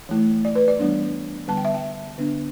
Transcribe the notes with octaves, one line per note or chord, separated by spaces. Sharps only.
E3 A3 E4
D5
B4
D5
E3 G3 B3 D4
D3 G3 B3 A5
G5
E5
G5
D3 B3 D4